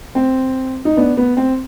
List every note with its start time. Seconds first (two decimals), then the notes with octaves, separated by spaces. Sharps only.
0.15 C4
0.85 D#4
0.97 B3 D4
1.17 B3
1.37 C4